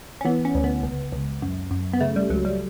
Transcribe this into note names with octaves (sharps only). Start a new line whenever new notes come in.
C#4
E3 B3
C#4
D2
B3
C#2
C#2
F#2
F#2
B3
C#3 A3
G3
C#2 F#3
G3